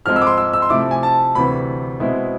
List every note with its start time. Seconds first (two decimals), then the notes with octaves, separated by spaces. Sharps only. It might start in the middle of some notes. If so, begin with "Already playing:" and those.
0.05 G#2 F3 G#3 C4 F6
0.16 E6
0.22 D6
0.27 C6
0.38 E6
0.53 E6
0.62 C6
0.69 C3 F3 A3 E4 D6
0.91 G#5
1.03 A5
1.35 D2 C3 E3 B5
2.00 B2 G#3 C4 E4